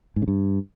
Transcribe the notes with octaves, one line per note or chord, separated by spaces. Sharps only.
G#2
C#3
G2